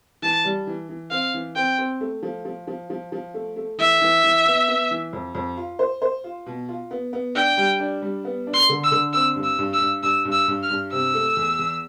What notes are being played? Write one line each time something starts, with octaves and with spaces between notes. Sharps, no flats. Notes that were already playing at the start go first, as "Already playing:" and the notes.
E3 A5
G3
E3
E3
C4 F5
E3
C4 G5
C4
A3
F3
F3
F3
F3
F3
A3
A3
E3 E5
E3
E3
B3
B3
E3
F2
F2
F4
C5
C5
F4
B2
F4
B3
B3
D4 G5
G3
D4
G3
B3
D4
C6
D3
E6
D3
C4 E6
G2
E6
G2
E6
G2
G2 E6
G2
E6
G2
F6
G2
C3 E6
A3
E2
E2